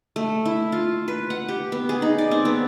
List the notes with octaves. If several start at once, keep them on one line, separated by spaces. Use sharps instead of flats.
A3
E4
F4
B4
F#5
G4
B3
G#4
D#4
D5
C4
B3